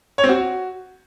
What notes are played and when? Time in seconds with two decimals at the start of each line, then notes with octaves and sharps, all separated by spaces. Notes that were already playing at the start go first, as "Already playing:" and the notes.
0.18 C#5
0.24 C4
0.29 F#4